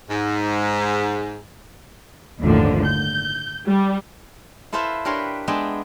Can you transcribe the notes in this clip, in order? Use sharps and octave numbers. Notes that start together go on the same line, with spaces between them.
G#2
G1 D#2 A2 D3 F3
G6
G3
E4 A4 B4 C5 E5 F5
D4 G4 A#4 B4 C#5 C6
G#3 B3 D4 E5 G5